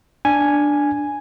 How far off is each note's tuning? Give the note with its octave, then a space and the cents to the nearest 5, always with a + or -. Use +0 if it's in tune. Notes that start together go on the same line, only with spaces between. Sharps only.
D4 +0 G#5 +0